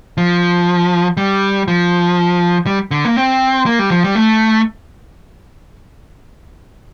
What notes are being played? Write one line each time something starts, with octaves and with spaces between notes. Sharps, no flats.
F3
G3
F3
G3
D3
A#3
C4
A#3
G3
F3
G3
A3